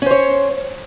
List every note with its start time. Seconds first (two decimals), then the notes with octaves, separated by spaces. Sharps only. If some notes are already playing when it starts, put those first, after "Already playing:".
0.02 C#4
0.06 C5
0.11 C#5